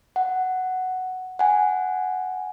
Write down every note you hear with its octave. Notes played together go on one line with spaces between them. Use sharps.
F#5
F#5 G#5